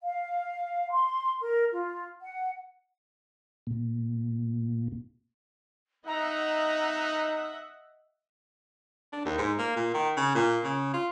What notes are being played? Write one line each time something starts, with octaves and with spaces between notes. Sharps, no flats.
F5
C6
A#4
F4
F#5
A#2
D#4 D#5 E5 F#5 A#5
D4
D#2
G#2
A#3
A#2
D#3
C#3
A#2
C#3
F4